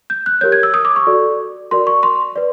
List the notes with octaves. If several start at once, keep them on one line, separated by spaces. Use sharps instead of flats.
G6
F#6
G4 A#4 C#5 G6
G#6
E6
D#6
D6
C#6
F#4 A4 D5
F#4 A#4 D5 C6
C#6
C6
B4 D5